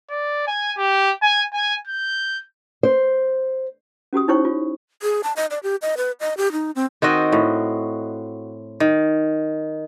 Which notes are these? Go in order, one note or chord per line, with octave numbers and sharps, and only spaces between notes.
D5
G#5
G4
G#5
G#5
G6
C5
C#4 F#4 G4 D#6
D#4 E4 C5 C#5 G5 C#6
F4
G#4
A5
D#5
D5
G4
D#5
B4
D#5
G4
D#4
C4
D#3 C4 F#4 D#5
A2
D#3